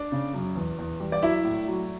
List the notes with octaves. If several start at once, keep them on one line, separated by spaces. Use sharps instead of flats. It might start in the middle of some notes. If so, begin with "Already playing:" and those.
Already playing: D4 D5
C#3
F#2
E2
E2
G3
D5
F#3 E4 E5
A2
F#3